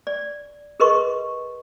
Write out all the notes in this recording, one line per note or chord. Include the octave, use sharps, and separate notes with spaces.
D5
G#4 A#4 B4 D#5 C6 C#6